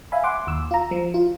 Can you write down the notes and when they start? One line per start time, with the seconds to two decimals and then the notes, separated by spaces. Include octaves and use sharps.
0.12 E5 F5 G#5 B5
0.24 F#5 C6 D6
0.47 D#2 E6
0.71 F4 A#5
0.91 F3
1.14 F4